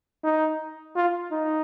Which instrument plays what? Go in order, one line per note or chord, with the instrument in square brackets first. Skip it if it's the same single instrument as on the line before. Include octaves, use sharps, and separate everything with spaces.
[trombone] D#4
F4
D#4